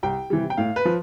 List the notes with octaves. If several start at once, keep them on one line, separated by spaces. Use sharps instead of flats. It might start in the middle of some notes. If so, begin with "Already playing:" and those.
C2 G5
C3 E3 G3
G5
A2 F5
B4
F3